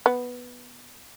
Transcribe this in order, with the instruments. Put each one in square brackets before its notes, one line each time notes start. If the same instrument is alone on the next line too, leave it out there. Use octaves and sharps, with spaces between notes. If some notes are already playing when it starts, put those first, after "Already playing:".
[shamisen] B3